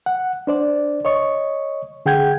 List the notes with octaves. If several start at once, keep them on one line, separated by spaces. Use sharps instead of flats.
F#5
D4 C5 D5
C#5 D#5 C#6
D3 G#4 F#5 G5 G6 G#6